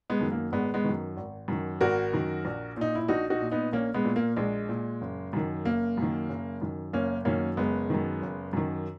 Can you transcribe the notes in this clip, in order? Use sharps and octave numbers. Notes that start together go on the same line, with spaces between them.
G#3 B3
F#2 D#3
A#3
G#1 G#3 B3
G#3 B3
F#2 D#3
G#1
F#2 D#3
G#1 F#4 A#4
F#2 D#3
A#1
A#2 D#4
E4
A#1 D#4 F#4
D#4 F#4
A#2
B3 D#4
A#1 A#3 C#4
G#3 B3
A#2
A#3
A#1 G#3
A#2
F#1
F#2 D#3
F#1 A#3
F#2 D#3
F#1
F#2 D#3
F#1 A#3 C#4
F#2 D#3 A#3 C#4
F#1 G#3 B3
F#2 D#3
F#1
F#2 D#3